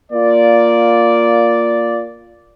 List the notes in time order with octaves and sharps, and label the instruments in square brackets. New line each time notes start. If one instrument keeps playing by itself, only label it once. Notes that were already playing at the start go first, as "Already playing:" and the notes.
[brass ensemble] A#3 F4 D5